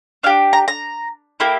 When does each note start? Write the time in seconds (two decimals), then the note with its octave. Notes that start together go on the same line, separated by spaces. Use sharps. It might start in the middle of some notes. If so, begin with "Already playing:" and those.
0.23 D4 G4 F5
0.53 A#5
0.68 A#5
1.40 A#3 E4 G4